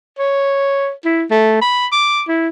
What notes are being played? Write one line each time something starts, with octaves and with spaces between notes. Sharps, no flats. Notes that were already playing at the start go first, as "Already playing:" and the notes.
C#5
E4
A3
B5
D6
E4